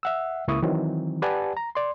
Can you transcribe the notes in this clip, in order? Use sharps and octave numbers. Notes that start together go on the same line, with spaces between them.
E5 F#5 E6
C#2 A#3 E4 C#6 D#6
D#3 E3 F#3 C4
G4 B4 D5 F#5 G#5 A5
A#5
D5 C6